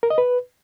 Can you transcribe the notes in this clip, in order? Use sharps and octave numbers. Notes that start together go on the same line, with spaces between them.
A#4
D#5
B4